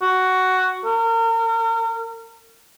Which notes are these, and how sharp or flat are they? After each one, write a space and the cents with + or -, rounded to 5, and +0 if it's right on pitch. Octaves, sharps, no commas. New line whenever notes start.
F#4 +10
A#4 -35